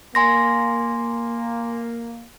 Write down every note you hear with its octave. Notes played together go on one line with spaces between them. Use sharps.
A#3 G#5 C6 A#6